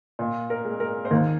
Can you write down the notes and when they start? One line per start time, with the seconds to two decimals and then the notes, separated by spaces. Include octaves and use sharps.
0.19 A#2
0.50 A#4
0.65 G#3
0.80 A#4
1.05 C5
1.11 D#2 A#4